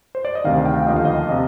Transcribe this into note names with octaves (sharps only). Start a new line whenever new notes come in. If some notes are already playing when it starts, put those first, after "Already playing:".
C5
D5
D#5
D2 C3 D#3 F5
G5
D#2 D3 F3 D#5
F5
D#5
C3 D#5